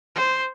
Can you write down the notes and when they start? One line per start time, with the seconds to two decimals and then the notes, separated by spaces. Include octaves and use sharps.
0.15 C5